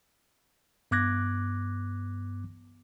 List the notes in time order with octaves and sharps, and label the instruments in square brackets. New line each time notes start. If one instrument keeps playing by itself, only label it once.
[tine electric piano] G2 B3 D6 F#6 G#6 A#6